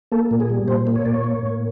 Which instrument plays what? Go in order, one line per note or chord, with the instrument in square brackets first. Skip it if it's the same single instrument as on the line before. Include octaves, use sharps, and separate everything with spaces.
[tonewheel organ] A#3 A4
A#2
G#4
G3
A#2 C5
A#3
C#5
A#2 D5
C#5
A#3
A2